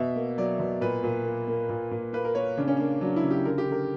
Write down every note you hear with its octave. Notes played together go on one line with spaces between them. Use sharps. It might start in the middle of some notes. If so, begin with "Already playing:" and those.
Already playing: B2 E5
A#3
F#3 D5
B2
A#2 B4
A#2
A#3
A#3
A#2
A#2
A#3 B4
A#4
A#3 C#5
C#3 D4
C#4
A#3 D4
F#3 D4
E4
C#3
G4
D3 A#4
G4
D3 A#4